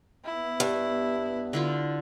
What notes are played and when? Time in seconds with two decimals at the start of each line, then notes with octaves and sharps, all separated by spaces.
0.25 B3 E4
0.60 G2
1.53 D3 E4 F4